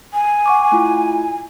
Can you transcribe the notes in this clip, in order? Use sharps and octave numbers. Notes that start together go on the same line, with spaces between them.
G#5
F#5 C#6 D6
A3 E4 F4